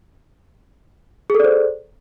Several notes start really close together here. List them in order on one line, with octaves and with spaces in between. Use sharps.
G#4 A4 D5 C5